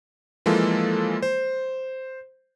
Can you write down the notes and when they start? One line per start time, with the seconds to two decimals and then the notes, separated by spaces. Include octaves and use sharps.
0.46 E3 F3 G#3 A#3 F4 A4
1.23 C5